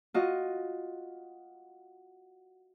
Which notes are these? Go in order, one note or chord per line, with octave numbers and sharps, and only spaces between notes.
F4 F#4 D#5